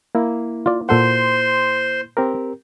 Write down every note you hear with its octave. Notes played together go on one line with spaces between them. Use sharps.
A#3 E4
F4 D5
A#2 A4 C5 F#5 C6
C4 G4 A#4